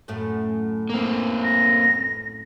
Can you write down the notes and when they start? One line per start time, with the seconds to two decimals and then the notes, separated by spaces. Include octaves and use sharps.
0.08 F#2 A2 A3
0.90 A#3 C4
1.44 A#6